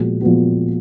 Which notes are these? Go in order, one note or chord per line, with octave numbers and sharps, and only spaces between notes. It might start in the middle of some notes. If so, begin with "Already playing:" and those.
Already playing: A#2 F3 G#3 B3 F#4
A#2 F3 G#3 B3 F#4